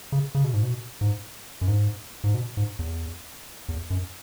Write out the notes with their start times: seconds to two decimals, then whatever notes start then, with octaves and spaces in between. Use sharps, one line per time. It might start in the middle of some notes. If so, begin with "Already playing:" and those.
0.12 C#3
0.35 C#3
0.44 B2
0.54 G#2
0.63 B2
1.01 G#2
1.61 F#2
1.68 G#2
2.24 G#2
2.34 B2
2.57 G#2
2.79 E2
3.69 E2
3.90 F#2